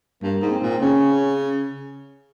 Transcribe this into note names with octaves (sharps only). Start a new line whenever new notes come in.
G2 A#3
G#2
C4
A#2
C#3 C#4